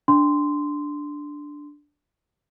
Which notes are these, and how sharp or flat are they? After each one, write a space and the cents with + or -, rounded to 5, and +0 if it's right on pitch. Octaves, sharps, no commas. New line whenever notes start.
D4 +0 C6 -15